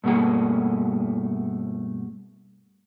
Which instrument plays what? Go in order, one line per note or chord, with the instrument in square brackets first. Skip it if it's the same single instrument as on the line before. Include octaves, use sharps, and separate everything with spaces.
[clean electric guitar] G2 B2 A3 A#3 G#4